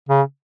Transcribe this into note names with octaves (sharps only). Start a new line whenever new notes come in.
C#3